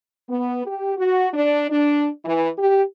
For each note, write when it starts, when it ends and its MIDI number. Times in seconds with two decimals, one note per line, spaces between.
0.29 0.61 59
0.65 0.94 67
0.97 1.28 66
1.33 1.64 62
1.70 2.08 62
2.25 2.49 52
2.58 2.82 67